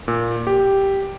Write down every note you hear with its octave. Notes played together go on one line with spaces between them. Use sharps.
A#2
G4